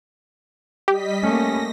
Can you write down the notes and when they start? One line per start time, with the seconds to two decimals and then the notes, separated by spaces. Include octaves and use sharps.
0.88 G3 G4 D#5 B6
1.23 A3 A#3 C#4 A#6